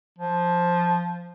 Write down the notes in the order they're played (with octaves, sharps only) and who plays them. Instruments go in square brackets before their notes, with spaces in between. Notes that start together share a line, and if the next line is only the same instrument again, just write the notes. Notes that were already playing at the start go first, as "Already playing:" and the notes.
[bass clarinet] F3